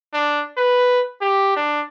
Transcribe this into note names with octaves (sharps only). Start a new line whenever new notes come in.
D4
B4
G4
D4